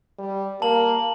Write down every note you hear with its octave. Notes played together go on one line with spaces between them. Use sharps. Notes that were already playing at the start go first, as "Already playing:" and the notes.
G3
A#3 A5 F#7